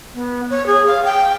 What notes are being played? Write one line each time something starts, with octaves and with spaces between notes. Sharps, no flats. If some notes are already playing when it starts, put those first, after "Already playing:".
B3
C#5
G#4
F5
G5